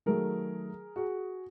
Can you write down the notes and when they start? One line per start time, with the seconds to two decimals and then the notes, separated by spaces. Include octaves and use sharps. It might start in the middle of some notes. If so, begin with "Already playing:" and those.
0.06 D#3 F#3 A3 G#4 A#4
0.96 F#4 G#4